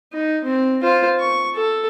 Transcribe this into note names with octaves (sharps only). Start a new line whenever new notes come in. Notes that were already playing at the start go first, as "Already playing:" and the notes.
D#4
C4
F4 C5
C#6
A4